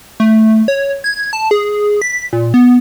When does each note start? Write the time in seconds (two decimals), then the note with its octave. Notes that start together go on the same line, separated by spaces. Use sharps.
0.20 A3
0.68 C#5
1.04 G#6
1.33 A5
1.51 G#4
2.02 B6
2.33 A#2
2.54 B3